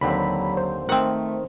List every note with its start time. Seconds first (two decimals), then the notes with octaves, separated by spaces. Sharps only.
0.01 D#2 D3 F#3 C4 B5
0.57 C5
0.89 D#3 A3 C4 F#5